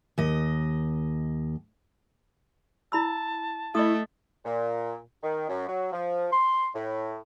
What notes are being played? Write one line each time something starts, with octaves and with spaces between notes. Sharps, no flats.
D#2 D#5
E4 A5 B5 E6
A3 E4 D#5 C#6 D#6
A#2
D#3
F#2
F#3
F3
C6
A2